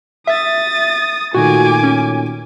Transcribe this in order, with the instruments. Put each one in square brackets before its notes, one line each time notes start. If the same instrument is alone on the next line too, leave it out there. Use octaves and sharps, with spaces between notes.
[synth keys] E5 [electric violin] D#6 A6
[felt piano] A#2 D#3 A3 [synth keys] F#4 [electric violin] G#5 D6
[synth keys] C#4